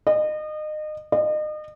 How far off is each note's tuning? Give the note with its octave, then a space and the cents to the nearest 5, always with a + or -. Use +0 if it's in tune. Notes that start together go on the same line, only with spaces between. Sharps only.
D#5 -30
D#5 -35